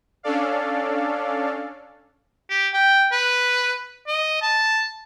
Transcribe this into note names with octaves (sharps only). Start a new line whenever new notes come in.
C#4 D4 A4 D5 F5
G4
G5
B4
D#5
A5